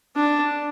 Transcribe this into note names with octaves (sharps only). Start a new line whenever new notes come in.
D4